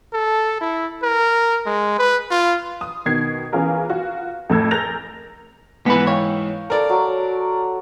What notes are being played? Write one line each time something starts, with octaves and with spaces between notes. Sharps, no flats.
A4
E4
A#4
G#3
B4
F4
D#6
B2 D#3 G#6 C7
E3 B3 C#4 F4 G#4 A#4
F4 F#4
F2 A2 E6 G#6
G#4 A#4 G6 A6 A#6 F7
G#2 E3 B3 B4
C#5 F5 G5 C#6
A4 A#4 C5 D5
F#3